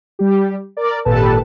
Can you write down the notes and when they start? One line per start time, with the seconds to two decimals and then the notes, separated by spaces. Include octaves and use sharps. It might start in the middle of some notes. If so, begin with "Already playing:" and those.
0.19 G3 G4
0.77 A#4 D5
1.05 G#1 A#2 G4 A4 B4 A5